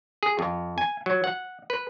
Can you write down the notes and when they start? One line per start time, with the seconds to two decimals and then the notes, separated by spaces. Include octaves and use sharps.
0.23 G#4
0.39 F2
0.78 G#5
1.06 F#3
1.24 F#5
1.70 B4